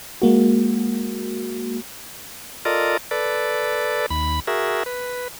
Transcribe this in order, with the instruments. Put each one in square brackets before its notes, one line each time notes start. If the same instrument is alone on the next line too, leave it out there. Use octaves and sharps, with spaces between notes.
[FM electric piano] G#3 A#3 F#4
[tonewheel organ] F4 A4 A#4 D5 D#5
A4 B4 D5
D#2 B5
F#4 G#4 A#4 E5
B4